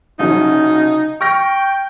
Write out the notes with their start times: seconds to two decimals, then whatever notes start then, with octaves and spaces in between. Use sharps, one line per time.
0.19 C2 C#3 F#3 D#4
1.21 G5 C#6 F6 A#6